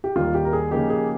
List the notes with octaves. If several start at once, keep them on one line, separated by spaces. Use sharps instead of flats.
G4
D#2 D#3 G3 F4
G4
A#4
G#4
C#3 F3 A#3 D#4 G4 G#4
G#4